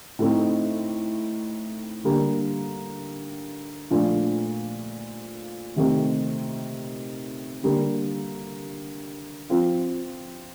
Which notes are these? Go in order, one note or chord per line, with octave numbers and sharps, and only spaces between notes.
A2 A3 C4 D#4
D3 G3 A#3
A#2 F3 A3 D4 F4
C3 D#3 A3 C4
D3 G3 A#3
F3 C4 F4